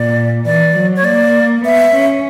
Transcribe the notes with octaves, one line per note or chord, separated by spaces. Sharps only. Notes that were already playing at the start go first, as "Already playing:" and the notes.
Already playing: A#2 D5
E3 D5
F#3
C#5
A#3 D5
B3 E5
C#4